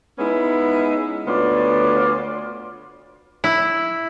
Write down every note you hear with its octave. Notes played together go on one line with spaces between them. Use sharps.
G#3 B3 C#4 D#4 E4
D2 B3 F4 C#5 D5
E4